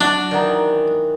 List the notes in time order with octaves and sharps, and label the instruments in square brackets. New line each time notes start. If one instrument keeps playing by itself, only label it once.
[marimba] F#3 [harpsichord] D4 [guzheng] F#4
[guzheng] D#3 E3 D#4 [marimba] D5 F#5 A#5